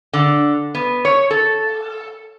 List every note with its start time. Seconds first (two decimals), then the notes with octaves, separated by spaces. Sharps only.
0.13 D3
0.75 B3
1.05 C#5
1.31 A4